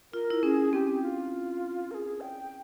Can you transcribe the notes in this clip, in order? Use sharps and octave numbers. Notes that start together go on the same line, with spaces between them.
F4 A#4
E4
C#4 G#4
C4 G4
F4
A#4
G#4
G5